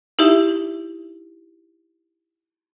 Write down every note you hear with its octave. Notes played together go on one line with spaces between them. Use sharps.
D#4 E4 G4 E5